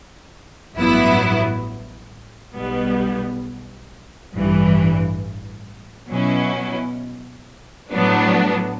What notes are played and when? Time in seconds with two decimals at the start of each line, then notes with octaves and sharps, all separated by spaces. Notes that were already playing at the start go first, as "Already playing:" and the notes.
0.75 A1 G2 F#3 B3 E4
2.54 B1 B2 G3 B3
4.33 A1 G2 E3
6.11 B2 F#3 C#4 E4
7.91 A2 F#3 B3 D4